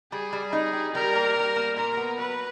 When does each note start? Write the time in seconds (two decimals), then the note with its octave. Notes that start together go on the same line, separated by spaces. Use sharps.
0.12 G3 G#4
0.33 G3
0.53 D#4
0.73 G4
0.94 G3 A#4
1.15 A#3
1.36 G3
1.56 A#3
1.77 A#2 A#4
1.97 B3
2.18 F#3 B4